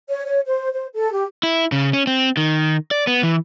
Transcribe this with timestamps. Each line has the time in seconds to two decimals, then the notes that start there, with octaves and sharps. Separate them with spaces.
0.09 C#5
0.25 C#5
0.46 C5
0.73 C5
0.94 A4
1.13 G4
1.43 E4
1.72 C#3
1.93 C#4
2.07 C4
2.37 D#3
2.91 D5
3.07 B3
3.23 E3